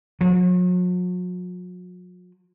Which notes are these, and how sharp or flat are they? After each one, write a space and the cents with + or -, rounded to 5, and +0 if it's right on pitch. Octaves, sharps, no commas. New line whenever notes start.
F#3 -45